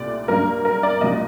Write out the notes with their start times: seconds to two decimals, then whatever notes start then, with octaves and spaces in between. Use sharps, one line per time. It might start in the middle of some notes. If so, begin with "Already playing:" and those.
Already playing: C2 A#2 A3 D5
0.28 G2 F#3 A#3 D4 A#4
0.65 A#4
0.83 D5
1.01 C2 A#2 F#3 A#3 D#5